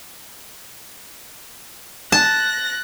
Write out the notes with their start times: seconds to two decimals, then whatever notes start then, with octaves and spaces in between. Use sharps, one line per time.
2.12 A5 F#6 A#6